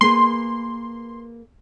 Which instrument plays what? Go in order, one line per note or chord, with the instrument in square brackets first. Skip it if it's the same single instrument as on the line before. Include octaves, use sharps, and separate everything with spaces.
[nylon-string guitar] A#3 G#4 B4 [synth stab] C6